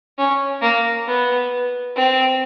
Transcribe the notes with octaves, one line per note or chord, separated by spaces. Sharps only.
C#4
A#3
B3
C4